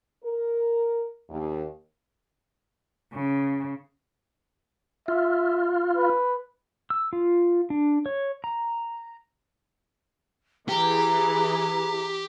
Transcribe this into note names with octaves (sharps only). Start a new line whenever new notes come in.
A#4
D#2
C#3
F4 E5
B4
E6
F4
D4
C#5
A#5
E3 G4 G#4 A#5